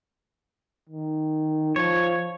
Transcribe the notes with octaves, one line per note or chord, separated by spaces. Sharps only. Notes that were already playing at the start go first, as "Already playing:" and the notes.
D#3
F3 C#5